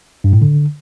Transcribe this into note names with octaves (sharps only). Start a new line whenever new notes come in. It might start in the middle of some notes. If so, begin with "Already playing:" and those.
G2
A2
D3